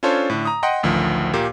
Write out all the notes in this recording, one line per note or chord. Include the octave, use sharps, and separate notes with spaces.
C#4 D4 F4 A4 C5 C#5
A2 D3
A#5 D#6
D#5 F#5 G5 C6 D#6
A1 D2 D#3 F3
A#2 A#3 G4